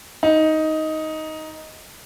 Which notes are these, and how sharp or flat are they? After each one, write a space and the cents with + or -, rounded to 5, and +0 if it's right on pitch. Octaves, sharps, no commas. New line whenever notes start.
D#4 +10